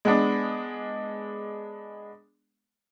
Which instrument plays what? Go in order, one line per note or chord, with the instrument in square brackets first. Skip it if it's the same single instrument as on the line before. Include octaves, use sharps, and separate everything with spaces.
[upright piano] G#3 B3 D4